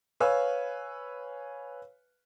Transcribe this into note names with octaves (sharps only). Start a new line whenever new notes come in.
B4 C#5 F5 G#5 E6